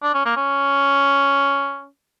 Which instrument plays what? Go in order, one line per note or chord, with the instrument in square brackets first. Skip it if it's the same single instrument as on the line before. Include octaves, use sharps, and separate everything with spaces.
[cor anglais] D4
C#4
A#3
C#4